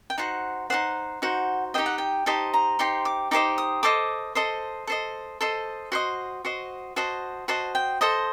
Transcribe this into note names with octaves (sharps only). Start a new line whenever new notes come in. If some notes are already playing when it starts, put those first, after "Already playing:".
G5
D#4 F#4 C5 F#5
D#4 F#4 C5 F#5
D#4 F#4 C5
D#4 G4 C5 D#5 G5
F#5
G5
D#4 G4 C5 D#5 A5
A#5
D#4 G4 C5 C6
D6
D#4 G4 C5 D#5 D6
D#6
A4 C5 D#5 D6
A4 C5 D#5
A4 C5 D#5
A4 C5 D#5
F#4 C5 D#5 C6
F#4 C5 D#5
F#4 C5 D#5 A5
F#4 C5 D#5 A5
G5
A4 C5 D#5 D#6